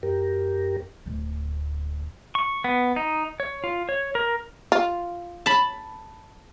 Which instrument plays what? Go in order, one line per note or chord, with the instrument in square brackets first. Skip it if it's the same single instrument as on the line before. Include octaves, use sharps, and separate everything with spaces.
[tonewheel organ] F#2 G4 A#4
[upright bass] D1 D2
[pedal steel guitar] C#6
B3
D#4
C#5
F4
C#5
A#4
[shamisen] F4
[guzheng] A5 B5